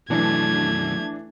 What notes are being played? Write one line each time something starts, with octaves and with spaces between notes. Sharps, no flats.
F#2 B2 E3 A3 D4 G#6